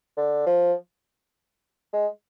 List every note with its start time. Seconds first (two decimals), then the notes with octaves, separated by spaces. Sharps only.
0.17 D3
0.46 F3
1.93 G#3